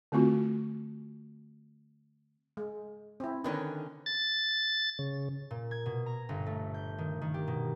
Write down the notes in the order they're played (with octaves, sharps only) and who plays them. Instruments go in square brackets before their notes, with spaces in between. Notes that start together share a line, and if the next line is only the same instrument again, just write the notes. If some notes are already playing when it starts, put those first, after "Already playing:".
[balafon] D3 A3 C4 F4 F#4
[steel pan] G#3
C4 E4
[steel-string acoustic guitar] D3 D#3 C#4 [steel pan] D#4 B4
[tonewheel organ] A6
C#3
[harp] A#2
G#6
B2
A#5
G1
A3
G6
D#3
D#3
G4
B2